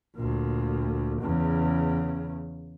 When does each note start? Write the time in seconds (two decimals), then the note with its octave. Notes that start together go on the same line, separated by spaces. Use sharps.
0.16 D2 A#2
1.21 E2 C#3